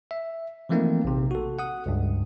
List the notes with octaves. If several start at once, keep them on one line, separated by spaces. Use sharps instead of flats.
E5
E3 F3 A3 A#3 C4 D#4
A#1 C3
F#4 A4
F#5 D#6
C#2 G2